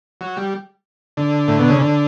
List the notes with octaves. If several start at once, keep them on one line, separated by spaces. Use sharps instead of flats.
F#3
G3
D3
A2
B2
C#3
D3